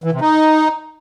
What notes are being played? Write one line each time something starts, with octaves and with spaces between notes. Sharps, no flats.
E3
C3
D#4